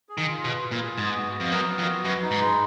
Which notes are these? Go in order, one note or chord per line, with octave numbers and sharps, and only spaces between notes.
G#4
D#3
F4
B2 B4
F4
A#2
G#4
G#2 B3
F#4
B3
F2
F#2 A#4
B3
F2
F#4
F#2 B4
D#4
G#2
G#3